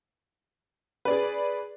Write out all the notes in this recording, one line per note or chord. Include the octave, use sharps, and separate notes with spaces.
G#4 B4 D5